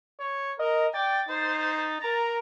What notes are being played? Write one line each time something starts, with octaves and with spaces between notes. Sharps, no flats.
C#5
A#4 D#5
D5 G5 A6
D#4 C5
A#4 A#5